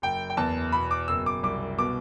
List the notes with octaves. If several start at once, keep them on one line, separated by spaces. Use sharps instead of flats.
F#1 G5
G5
E2 A5
B2 B5
D6
F#1 E6
D6
C2 D6
B2 D6